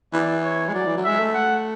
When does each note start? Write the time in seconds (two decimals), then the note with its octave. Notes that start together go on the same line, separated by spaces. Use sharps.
0.13 E3 D5
0.43 C#5
0.69 G#3
0.74 F#3 D5
0.87 E3
0.97 F#3
1.04 G#3 E5
1.19 A3
1.34 F#5